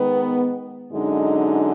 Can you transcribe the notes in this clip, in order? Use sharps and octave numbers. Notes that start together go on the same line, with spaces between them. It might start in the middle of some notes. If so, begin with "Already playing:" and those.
Already playing: D#3 G#3 B3
F#2 D3 G#3 D#4